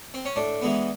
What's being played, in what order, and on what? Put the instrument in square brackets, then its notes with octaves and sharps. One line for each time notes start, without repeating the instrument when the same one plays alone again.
[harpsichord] C4
C#4
A2 D4
E3 G#3 B3